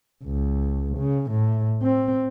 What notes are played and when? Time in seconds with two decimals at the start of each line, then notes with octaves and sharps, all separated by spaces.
0.24 C#2
0.98 C#3
1.31 A2
1.82 C4